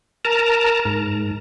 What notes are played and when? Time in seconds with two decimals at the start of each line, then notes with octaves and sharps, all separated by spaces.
0.25 A#4 A5 A#5
0.85 G#2